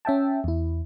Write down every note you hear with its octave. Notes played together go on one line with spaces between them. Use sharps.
C#4 E5 G5 A5
E2 E4